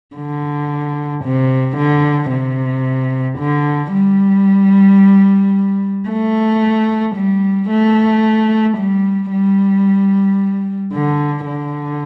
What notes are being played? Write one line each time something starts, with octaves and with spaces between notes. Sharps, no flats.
D3
C3
D3
C3
D3
G3
A3
G3
A3
G3
G3
D3
D3